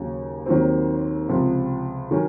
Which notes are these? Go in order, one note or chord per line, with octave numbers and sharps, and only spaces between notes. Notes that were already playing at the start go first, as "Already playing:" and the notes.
Already playing: D#2 C#3 F#3
D#2 D#3 F#3 C4
C#2 C3 F3
D#3 F#3 C#4